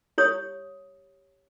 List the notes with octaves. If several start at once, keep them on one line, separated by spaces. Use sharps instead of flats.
G4 C#5 D#6